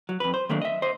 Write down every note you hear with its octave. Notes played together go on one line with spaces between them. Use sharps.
F#3
F2 B4
C5
D#3 F#3 A3 A#3 D4
D#5 E5
C5 D#5